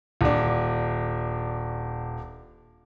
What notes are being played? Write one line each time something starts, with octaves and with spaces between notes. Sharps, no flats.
D#1 D4